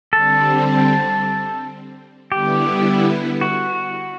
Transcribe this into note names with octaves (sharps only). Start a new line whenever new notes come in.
D3 G3 C4 A4
D3 G3 B3 E4 G4
F#4